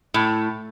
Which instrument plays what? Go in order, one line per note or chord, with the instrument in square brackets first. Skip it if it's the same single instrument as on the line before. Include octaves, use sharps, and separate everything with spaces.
[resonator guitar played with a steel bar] A2